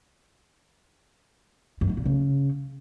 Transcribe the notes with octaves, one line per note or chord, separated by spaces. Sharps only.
F#2
G#2
A#2
C#3